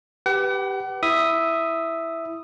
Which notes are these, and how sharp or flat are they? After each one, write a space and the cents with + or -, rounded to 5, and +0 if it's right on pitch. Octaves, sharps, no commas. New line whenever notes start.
G4 +0 B4 +0 F#5 +40
E4 +0 E5 +0 D#6 +0